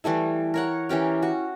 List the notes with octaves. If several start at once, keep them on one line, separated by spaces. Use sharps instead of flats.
E3 G3 A3 E4
A#4 C#5 F#5
E3 C#4 G4 A#4
F#4